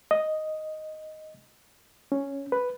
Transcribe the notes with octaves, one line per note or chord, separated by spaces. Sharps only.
D#5
C#4
B4